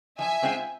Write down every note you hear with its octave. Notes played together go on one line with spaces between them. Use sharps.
F3 E5 G#5
G#3 C4 F4